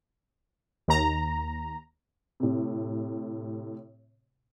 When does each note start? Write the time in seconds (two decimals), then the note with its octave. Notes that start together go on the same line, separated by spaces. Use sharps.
0.88 D#2 A#5
2.40 A2 C3